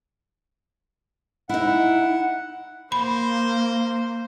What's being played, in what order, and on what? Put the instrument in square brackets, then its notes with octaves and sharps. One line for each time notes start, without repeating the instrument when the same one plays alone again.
[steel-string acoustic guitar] D#4 E4 [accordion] F#5
[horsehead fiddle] A#3 [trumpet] C5 [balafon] B5